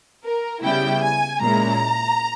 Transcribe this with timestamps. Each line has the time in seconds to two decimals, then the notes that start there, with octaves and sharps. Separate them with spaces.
0.25 A#4
0.64 C#3 G3 B3 E4 G5
1.04 G#5
1.43 A#2 G#3 C#4 E4 A#5